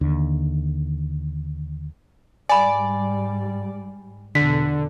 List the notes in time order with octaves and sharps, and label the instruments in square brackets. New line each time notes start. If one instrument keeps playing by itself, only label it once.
[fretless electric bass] D#2 D3
[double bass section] G#2 G3 [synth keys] D5 [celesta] G#5 B5
[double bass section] E2 B2 [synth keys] D3 [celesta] B6